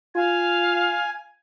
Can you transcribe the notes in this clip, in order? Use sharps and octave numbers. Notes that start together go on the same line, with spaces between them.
F4 F5 G#5